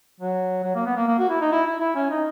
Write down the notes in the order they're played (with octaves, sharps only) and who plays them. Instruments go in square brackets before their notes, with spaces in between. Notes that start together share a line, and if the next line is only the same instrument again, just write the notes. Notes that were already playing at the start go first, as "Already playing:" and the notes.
[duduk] F#3
F#3
A#3
B3
A#3
A#3
F#4
E4
D#4
E4
E4
E4
C#4
D#4